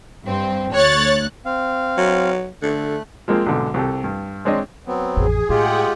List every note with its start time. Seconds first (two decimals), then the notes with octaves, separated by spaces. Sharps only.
0.25 G2 C4
0.73 D2 C#5 F#6 A6
1.45 C4 F5
1.98 F#3
2.62 D3 A3 F#6
3.28 F3 G#3 A#3 C4
3.46 B1 G#2 D3
3.74 C2 G4 A4
4.04 G2
4.45 G#3 C4 D4 C#5 D#5
4.87 F#3 B3 C4
5.17 A1 F2 G#4
5.49 A2 G#3 F4 G4 G#4 F#5 G5